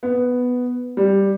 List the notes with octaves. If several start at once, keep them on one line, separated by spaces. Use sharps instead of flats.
B3
G3